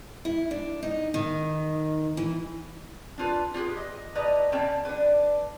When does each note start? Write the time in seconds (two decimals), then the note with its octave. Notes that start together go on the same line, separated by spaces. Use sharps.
0.25 E4
0.51 D4
0.83 D#4
1.14 D#3
2.17 E3
3.18 D4 F4 B4
3.54 F4 G4 G#4 B4
3.77 D#5
4.15 A2 B4 D5 D#5 A#5
4.52 B2 C#4 D5 G5 A5
4.85 D4 B4